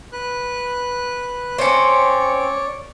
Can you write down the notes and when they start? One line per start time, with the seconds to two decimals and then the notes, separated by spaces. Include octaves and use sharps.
0.12 B4 F#6
1.58 C4 C#4 C#5 D5